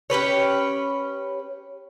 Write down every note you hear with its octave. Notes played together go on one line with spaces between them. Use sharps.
C#4 G4 B4 C#5